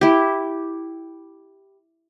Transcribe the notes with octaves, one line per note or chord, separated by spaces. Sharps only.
E4 G4